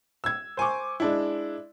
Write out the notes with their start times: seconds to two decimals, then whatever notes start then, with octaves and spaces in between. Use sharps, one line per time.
0.24 E6 G#6
0.57 C5 G#5 C#6 D6
1.00 G#3 D4 E4